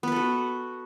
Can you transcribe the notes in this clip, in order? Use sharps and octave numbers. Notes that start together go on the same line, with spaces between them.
B3 F#4 A4 B4